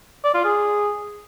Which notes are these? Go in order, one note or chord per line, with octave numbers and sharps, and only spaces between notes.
D5
F4
G#4